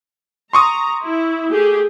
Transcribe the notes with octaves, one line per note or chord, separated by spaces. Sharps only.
A#5 C6 C#6 D#6
E4
A3 G4 G#4